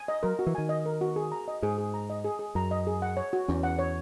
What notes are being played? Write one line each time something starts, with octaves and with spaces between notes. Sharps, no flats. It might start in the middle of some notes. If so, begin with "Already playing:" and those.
Already playing: G#5
D#5
F#3 A#4
F#4
E3
D#3 G#5
D#5
A#4
F#4
G#4
A#5
D#5
G#2 G#4
G#4
A#5
D#5
G#4
G#4
F#2 A#5
D#5
G#4
F#5
C#5
F#4
E2 C#4
F#5
C#5